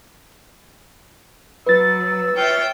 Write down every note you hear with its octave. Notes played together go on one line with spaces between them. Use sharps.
F#3 B4 E6 A6
F4 C#5 E5 G5